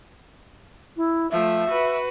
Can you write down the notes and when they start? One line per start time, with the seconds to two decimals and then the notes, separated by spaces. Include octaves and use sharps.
0.97 E4
1.31 F3 A3 E5
1.69 F#4 B4